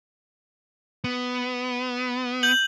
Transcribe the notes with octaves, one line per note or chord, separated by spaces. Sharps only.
B3
G6 F#7